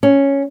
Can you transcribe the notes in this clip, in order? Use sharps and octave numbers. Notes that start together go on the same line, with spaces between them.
C#4